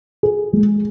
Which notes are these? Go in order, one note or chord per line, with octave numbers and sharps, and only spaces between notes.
G#4
G#3